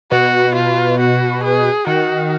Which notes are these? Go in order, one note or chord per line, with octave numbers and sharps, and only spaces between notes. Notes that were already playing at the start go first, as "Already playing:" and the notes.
B2 F#4
F4
F#4
G#4
D#3 F#4